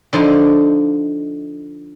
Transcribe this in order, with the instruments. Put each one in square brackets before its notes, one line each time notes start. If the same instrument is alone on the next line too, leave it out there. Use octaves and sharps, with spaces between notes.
[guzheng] D3 F3 D#4